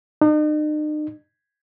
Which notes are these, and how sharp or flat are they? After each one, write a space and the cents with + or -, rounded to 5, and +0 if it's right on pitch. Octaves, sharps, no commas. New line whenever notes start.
D#4 -40